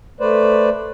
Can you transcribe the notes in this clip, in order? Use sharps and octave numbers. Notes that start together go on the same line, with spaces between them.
A3 B4 C5 D5